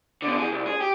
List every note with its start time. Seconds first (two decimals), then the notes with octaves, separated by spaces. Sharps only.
0.22 D3 B3
0.37 E3 G#4
0.51 C2
0.66 G#4
0.81 G4